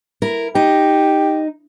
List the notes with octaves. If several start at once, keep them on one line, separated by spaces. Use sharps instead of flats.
E4 A#4
D#4 G4